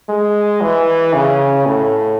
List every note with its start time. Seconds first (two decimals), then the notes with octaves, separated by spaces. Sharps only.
0.09 G#3
0.62 E3
1.14 C#3
1.66 A2